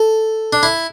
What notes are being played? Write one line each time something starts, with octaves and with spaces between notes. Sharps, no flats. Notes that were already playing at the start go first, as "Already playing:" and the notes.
Already playing: A4
D4
E4